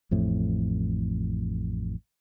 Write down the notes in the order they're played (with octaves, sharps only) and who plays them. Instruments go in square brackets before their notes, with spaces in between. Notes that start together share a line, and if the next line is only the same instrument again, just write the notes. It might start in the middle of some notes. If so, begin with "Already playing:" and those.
[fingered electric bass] A1 F2 A2